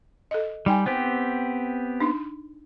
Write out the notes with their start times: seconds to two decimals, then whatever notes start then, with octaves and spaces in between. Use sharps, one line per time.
0.31 A4 D#5
0.66 G3 D#4 G5 G#5
0.86 B3 C4 G4 C5
2.00 D4 D#4